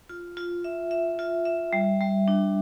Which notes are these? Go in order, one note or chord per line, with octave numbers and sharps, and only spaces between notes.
F4
F4
E5
E5
F4
E5
G3
G3
D4